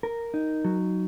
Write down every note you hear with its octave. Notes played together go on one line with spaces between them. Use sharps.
A#4
D#4
F#3